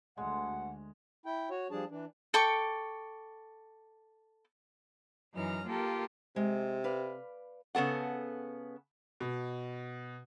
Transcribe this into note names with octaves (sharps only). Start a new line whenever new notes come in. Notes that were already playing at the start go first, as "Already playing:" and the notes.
D2 G#3 F#5
E4 G5
F#4 C#5
F3 G3 D4 G#4 A5
E3 D4
A4 G5 C#6 D6
F#2 E3 D#4 A#5 F6
A#3 F4 G4 A4 A#4
C3 G#3
B4 D5 F5
C#3 B3 A4 F#5
B2